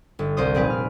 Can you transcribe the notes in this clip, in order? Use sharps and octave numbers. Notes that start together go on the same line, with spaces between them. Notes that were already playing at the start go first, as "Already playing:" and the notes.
G1
C2 C3 C5 D#6
F1 A#2 C4 G#4 B4
F6